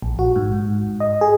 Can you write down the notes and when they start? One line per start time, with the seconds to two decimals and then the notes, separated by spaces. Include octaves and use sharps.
0.02 A#1
0.19 F#4
0.36 G#2
1.00 D#5
1.21 G#4